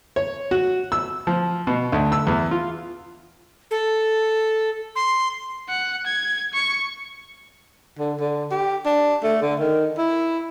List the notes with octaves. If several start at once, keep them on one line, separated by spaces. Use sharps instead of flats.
C#5
F#4
E6
F3
B2
D2
E6
E2
F4
A4
C6
F#5
G#6
C#6
D3
D3
G4
D4
A3
D3
D#3
E4